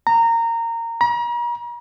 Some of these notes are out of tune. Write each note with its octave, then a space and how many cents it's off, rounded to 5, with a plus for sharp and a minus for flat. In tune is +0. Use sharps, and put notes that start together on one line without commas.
A#5 -20
A#5 +40